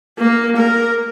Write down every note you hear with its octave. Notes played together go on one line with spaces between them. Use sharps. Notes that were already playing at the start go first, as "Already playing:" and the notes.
A#3
A#4